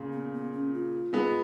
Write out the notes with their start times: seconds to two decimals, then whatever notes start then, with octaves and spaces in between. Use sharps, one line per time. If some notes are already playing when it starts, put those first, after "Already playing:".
Already playing: A#2 C#3
0.12 B3
0.33 B3
0.53 C#4
0.74 F4
1.13 G#3 B3